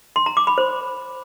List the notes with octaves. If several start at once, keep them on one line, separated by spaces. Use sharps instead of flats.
C6
A#5
D6
B5
C5